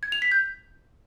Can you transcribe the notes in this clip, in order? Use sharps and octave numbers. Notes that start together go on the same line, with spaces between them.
G#6
F7
B6
G6